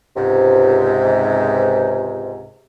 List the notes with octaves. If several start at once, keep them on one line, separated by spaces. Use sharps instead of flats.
C#2 G#2 C3